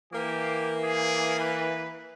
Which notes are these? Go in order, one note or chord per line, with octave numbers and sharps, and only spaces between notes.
E3 A#3 G4
G#4
B4